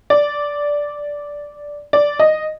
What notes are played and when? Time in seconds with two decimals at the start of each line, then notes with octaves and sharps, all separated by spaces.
0.10 D5
1.93 D5
2.19 D#5